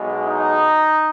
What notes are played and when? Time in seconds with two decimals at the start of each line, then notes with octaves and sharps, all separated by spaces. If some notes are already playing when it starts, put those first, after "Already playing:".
Already playing: B1 B2 G#3
0.25 D#4